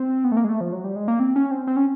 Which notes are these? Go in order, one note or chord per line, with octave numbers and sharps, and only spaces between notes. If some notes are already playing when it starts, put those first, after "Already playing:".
Already playing: C4
B3
A3
A#3
G#3
A3
F3
F#3
G3
G#3
A#3
C4
C#4
C4
C4
C#4